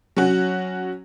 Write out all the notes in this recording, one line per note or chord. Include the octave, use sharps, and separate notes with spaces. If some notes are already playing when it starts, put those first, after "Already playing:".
F#3 C#4 F#4